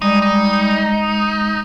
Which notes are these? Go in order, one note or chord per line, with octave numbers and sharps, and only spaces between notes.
G3 G#3 D#4
D#4